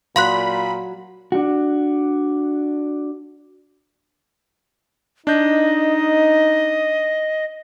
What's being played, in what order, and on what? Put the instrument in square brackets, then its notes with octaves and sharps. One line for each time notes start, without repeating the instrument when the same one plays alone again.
[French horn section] A#2 [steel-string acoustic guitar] F#3 [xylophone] F5 C6 F#6 [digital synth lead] B5
[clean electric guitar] D4 F#4
[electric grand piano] D4 G6 [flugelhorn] D#4 [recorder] D#5